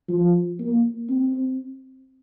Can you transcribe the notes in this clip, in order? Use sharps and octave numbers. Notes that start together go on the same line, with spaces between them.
F3
A#3
C4